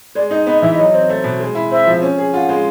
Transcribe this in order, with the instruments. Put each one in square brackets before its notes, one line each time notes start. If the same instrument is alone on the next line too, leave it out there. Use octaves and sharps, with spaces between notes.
[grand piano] G#3 [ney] D5
[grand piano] D#4 [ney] D#5
[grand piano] B3 [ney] D#5
[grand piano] E3 [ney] E5
[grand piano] F#3 [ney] D#5
[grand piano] C4
A3
B2
G#3
E4
[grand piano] C4 [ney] E5
[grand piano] F3
C#4
G#4
[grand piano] F4 [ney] F#5
[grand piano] G#3